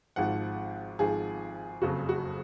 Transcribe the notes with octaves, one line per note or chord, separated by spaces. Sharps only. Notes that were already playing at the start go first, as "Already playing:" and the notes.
G#1 G#2 F3 F#5
G#1 G#2 F3 G#4
F#1 F2 C#3 F#3 F#4
F#4